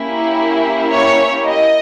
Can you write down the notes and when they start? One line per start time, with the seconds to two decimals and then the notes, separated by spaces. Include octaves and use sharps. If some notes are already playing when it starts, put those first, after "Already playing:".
Already playing: A#3 C#4 E4 G4
0.91 C#5
1.46 D#5